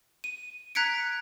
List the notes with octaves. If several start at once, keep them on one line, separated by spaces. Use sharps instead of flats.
D#7
A#5 F#6 G#6 B6 C#7 D7